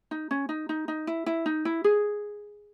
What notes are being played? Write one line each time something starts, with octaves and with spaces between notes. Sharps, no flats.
D#4
C#4
D#4
D#4
D#4
E4
E4
D#4
E4
G#4